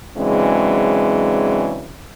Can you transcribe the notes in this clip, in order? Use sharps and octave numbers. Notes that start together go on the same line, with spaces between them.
C#3 E3 F#3 G#3 C4 D4